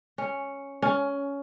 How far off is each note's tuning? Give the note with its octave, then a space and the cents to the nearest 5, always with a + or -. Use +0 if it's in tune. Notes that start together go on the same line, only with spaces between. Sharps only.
C#4 +0
C#4 +15